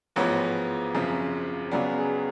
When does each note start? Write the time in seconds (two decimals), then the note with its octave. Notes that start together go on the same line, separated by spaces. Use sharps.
0.16 A1 G#2 F3 G#3 B3 C#5
0.94 G#1 F#2 C#3 F3
1.71 C#2 C#3 F#3 B3 D5
1.98 G#4